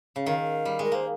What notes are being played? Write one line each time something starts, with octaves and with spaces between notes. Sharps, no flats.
C#3
D#3 F5
G3
G#3
A#4
A#3 C5